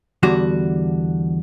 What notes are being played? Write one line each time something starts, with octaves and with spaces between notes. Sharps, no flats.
E2 D3 G3 F#4